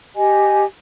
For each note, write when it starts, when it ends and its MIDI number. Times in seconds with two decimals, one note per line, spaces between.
0.15 0.64 67
0.15 0.64 75
0.15 0.64 80